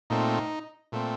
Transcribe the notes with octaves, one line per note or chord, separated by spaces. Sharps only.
A#2 A3 C4 D#4
A#2 A3 C4